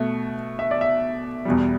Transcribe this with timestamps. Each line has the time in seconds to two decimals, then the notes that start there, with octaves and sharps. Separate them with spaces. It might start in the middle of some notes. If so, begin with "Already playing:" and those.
Already playing: B2 A3
0.59 E5
0.71 D5
0.81 E5
1.45 E2 B2 G3